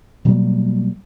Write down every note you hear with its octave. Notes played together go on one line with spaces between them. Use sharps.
B2 F#3 G3 A#3